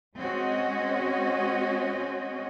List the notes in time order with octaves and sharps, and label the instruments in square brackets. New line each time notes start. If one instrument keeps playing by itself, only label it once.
[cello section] G#3 C4 C#4 F#4 D#5